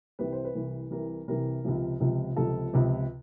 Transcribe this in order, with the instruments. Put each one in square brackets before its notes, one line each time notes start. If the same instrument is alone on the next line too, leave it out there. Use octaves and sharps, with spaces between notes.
[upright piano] C2 C3 E3 B4
C5
B4
C2 C3 E3
C2 C3 E3 A#4
C2 C3 E3 A#4
C#2 C3 F3
C#2 C3 F3
C#2 C3 F3 A4
C#2 C3 F3